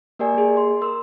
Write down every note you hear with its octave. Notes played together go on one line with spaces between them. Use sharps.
A#3 G4 A#4 D5 G#5
A#3 G#4
C6
A#4 C6 E6